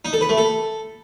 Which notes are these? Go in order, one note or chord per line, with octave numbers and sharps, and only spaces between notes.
D#4
A4
B4
A3
A4